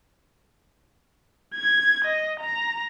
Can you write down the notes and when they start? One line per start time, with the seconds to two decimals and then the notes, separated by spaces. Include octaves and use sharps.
1.55 G#6
2.05 D#5
2.40 A#5